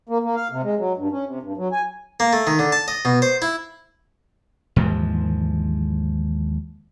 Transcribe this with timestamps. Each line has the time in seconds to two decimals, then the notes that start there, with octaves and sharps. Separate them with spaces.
0.09 A#3
0.23 A#3
0.36 F5
0.51 C3
0.63 G#3
0.79 F#3
0.97 G2
1.12 C#4
1.26 C3
1.42 G2
1.57 F#3
1.72 G#5
2.20 A#3
2.33 A3
2.47 D#3
2.59 D3
2.72 A5
2.88 D#5
3.05 B2
3.22 C5
3.42 E4
4.76 D#2 G#2 E3 F3